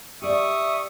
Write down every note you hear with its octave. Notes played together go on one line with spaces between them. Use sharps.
G4 D5 E5 C#6 D#6